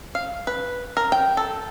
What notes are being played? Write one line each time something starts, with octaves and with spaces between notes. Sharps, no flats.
F5
B4
A#4
G5
A4